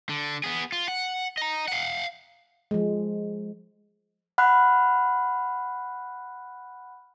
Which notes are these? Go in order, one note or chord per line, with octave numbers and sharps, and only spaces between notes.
D3
B3 G#4
F4
F#5
D#5 A#5
F5 F#5
F3 G#3
F#5 B5 F6 F#6